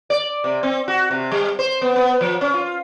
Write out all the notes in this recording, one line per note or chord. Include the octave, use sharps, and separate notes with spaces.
D5
C3
C4
F#4
C3
G3
C5
B3
B3
F3
C#4
F4